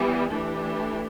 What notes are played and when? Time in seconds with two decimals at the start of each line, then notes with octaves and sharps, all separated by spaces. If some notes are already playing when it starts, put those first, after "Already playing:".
Already playing: E3 G3 B3
0.30 E3 A3 D4 G4